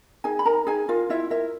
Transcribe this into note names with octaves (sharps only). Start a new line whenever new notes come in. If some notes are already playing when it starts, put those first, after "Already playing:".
D#4 G#4 G#5
B5
D#4 A#4 A#5
D#4 G#4 G#5
F4 A#4 F5
E4 F4 E5
E4 A#4 E5